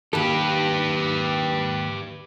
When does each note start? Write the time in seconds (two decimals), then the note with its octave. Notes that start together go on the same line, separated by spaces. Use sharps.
0.13 D#2 G4 A4 B4